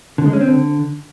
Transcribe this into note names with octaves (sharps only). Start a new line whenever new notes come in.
D3
G#3
C#4
C4
D3